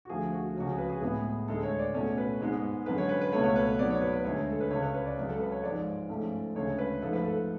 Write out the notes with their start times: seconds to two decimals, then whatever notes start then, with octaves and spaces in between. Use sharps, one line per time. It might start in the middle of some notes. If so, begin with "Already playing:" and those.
0.05 F#4
0.09 D2 D3 F3 A3 G#4
0.33 F#4
0.56 C#2 C#3 F3 G#3 C#4 F#4
0.67 G#4
0.78 B4
0.90 G#4
1.01 A2 G#3 B3 G#4
1.47 D2 D3 G#3 A4
1.63 C#5
1.79 D5
1.94 B2 A3 C#4 C#5
2.18 B4
2.41 G#2 G#3 B3
2.86 F#2 D3 G#3 B4
2.98 C#5
3.09 B4
3.21 B4
3.32 C#2 B2 A3 C#5
3.43 C#5
3.56 B4
3.67 C#5
3.79 G#2 F#3 B3 D5
3.90 C#5
4.02 B4
4.13 B4
4.24 D2 D3 G#3 C#5
4.50 A4
4.61 B4
4.71 C#2 C#3 G#3 C#5
4.82 C#5
4.94 B4
5.06 D5
5.17 F#2 C#3 G#3
5.29 A4
5.40 B4
5.52 C#5
5.64 G#2 F3 G#3 D5
6.09 G#2 F3 A3 C#4
6.55 D2 C#3 G#3 C#4 C#5
6.78 B4
7.02 G#2 F3 A3 A4
7.13 B4
7.25 A4